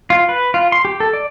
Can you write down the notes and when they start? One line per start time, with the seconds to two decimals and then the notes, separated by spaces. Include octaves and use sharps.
0.10 F4
0.29 B4
0.54 F4
0.72 C6
0.85 G4
1.00 A4
1.13 D5